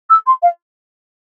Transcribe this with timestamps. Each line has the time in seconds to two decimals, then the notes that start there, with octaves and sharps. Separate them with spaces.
0.10 E6
0.26 C6
0.42 F5